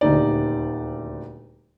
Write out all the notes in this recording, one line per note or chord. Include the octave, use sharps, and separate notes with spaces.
D#1 D2 D#4 D5